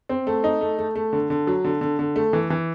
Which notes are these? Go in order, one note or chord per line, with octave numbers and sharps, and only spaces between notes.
C4
A3
D#4
A3
A3
A3
D3
D3
F#3
D3
D3
D3
A3
E3
E3